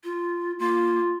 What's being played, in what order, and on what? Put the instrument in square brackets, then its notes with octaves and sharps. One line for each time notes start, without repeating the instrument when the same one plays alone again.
[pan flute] F4
[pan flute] A#3 [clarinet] F4